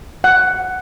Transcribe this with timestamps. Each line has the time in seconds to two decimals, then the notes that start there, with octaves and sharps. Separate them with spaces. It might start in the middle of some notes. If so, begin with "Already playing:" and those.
0.24 F#5